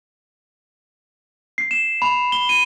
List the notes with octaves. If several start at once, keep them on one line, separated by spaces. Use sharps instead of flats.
C7
E7
B5
G7
D#7